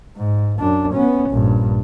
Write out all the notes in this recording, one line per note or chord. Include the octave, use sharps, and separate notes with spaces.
G#2
F#2 D4
B3 C#4
A#1 G2